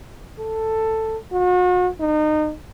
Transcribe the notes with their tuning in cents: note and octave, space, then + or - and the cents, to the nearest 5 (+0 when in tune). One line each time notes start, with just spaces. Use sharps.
A4 +10
F#4 -40
D#4 -30